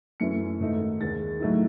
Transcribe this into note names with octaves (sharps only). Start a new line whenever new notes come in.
F#2 E3 A3 C#4 E4 C#7
G#2 D#3 A3 D#4
D#2 D#3 G#3 A6
A2 F#3 A3 D#4